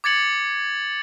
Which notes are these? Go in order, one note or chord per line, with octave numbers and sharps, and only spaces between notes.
D6 G#6 A6 C#7 F#7